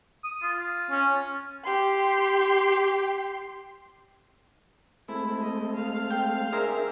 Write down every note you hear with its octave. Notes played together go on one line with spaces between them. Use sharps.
D#6
F4
C#4
G4 C6
G#3 A3 C4 E4
D#5
F5
G5
D4 G#4 A#4 C5 E5